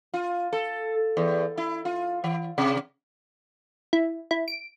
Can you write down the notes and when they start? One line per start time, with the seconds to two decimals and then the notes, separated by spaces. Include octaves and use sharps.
0.14 F4
0.53 A4
1.17 E2
1.58 E4
1.85 F4
2.24 E3
2.58 C3
3.93 E4
4.31 E4
4.48 D7